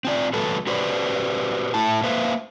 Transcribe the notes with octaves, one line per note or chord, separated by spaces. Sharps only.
C4 F4 D5
F#3 G#3 A4 B4
F#4 G4 B4 C5 D5
A2 A3 E4 A5
A#3 B4 C5 E5 F5